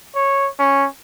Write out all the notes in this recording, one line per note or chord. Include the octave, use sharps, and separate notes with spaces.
C#5
C#4